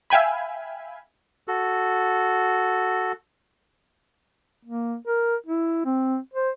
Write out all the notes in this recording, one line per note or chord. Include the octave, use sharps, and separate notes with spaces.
E5 F5 G5 G#5 B5
F#4 A4
A#3
A#4
E4
C4
C5